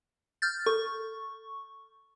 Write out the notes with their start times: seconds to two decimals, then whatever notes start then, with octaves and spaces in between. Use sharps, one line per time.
0.42 F6 G6 A6
0.66 A4 C#6